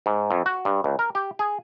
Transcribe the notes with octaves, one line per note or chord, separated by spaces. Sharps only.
G#2
F2
F#4
G2
C#2
A#4
G4
G#4